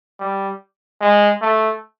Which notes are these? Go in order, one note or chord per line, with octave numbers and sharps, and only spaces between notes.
G3
G#3
A3